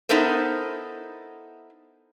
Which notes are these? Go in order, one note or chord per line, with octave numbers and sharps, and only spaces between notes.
B3 D#4 E4 A4 A#4 C5